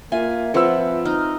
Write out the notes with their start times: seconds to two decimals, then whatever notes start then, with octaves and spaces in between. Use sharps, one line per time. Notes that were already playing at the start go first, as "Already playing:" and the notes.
0.12 A#3 F4 E5 G#5
0.54 F3 C4 B4 F#5 E6
1.05 D#4 F6